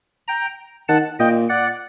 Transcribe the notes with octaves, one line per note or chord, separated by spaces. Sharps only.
G5 A#5
D#3 F#5 A5
A#2 D#5 G5
D5 F#5